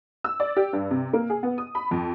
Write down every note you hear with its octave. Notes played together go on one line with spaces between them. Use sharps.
E6
D5
G4
G2
C3
A#3
G#4
B3
D#6
B5
F2